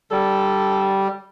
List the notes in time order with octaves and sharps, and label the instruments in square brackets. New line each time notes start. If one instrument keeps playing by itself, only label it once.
[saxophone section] D3 A4 [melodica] G3